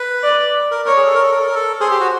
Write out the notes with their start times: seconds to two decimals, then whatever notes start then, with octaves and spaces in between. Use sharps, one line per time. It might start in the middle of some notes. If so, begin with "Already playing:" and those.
Already playing: B4
0.23 D5
0.71 A#4
0.85 A#4 C#5
0.97 G#4
1.07 A4
1.14 A#4
1.23 A4
1.31 A#4
1.39 A4
1.47 A#4
1.55 A4
1.81 G#4 C5
1.91 G4
2.00 F#4